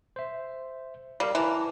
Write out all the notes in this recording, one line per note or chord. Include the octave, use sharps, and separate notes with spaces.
C5 E5
G3 A#4 F5
E3 A5 A#5 D6